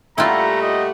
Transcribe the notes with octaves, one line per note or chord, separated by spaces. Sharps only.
A#2 G3 A3 E4 F4 G4 F#5 A#5
D#5